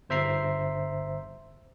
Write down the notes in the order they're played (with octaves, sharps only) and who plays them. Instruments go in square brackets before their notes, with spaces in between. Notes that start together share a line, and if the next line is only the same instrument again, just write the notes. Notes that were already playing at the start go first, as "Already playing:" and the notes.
[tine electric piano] G1 C5 E5 A#5 C7